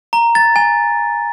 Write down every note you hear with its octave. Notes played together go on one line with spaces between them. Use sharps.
A#5
A6
G#5